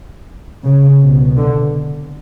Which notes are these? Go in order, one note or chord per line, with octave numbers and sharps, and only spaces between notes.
C#3
C2 B2
D3